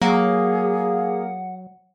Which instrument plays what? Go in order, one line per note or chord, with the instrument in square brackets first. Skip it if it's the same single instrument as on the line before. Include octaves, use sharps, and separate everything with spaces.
[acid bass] F#3 [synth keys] A#3 [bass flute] G#4 [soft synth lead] F#5